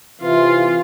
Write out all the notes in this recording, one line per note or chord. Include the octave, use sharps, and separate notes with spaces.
C3 E3 F4